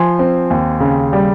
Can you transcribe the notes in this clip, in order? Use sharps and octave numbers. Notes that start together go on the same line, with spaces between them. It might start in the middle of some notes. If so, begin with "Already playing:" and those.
Already playing: F3 G#5 C6
C4
D#2
C#3
G3